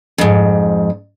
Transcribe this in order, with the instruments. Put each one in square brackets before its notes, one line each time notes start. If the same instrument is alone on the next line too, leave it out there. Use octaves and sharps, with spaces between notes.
[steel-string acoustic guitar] F2 G#2